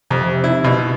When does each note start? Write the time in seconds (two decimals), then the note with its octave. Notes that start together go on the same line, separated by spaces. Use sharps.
0.10 F2 C3
0.44 E4
0.64 B2